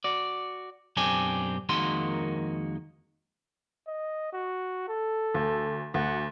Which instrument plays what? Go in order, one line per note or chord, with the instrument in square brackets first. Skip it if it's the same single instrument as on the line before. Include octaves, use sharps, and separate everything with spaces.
[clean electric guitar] F#4 D5
B1 F#2 C4 D4 G4 G#5
F2 D#3 G#3 A#3 F#4 C6
[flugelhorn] D#5
F#4
A4
[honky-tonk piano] D2
[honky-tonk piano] D2 [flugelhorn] F#5